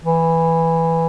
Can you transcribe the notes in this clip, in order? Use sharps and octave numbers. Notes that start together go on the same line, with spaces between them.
E3